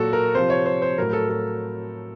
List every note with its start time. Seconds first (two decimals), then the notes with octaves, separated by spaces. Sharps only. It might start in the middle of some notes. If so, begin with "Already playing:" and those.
Already playing: A#2 F#3 F#4 A4
0.13 A#4
0.34 C3 F3 C5
0.50 C#5
0.66 C5
0.82 C5
0.98 A2 F#3 A#4
1.13 A4
1.29 A4